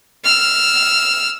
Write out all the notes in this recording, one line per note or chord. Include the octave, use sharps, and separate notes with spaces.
E6 F6